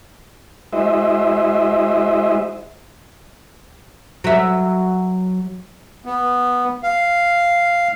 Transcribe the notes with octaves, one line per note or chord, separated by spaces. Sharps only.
G#3 E4 F#4 C5 D#5 E5
F#3 E5
B3
F5